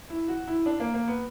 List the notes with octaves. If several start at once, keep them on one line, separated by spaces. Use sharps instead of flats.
E4
F#4
E4
D4
A#3
A#3
B3